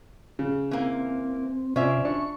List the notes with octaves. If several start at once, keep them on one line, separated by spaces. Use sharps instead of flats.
C#3
E3 A#3 C4
C3 C#4 F4 C5 D5 E5
D4 C#6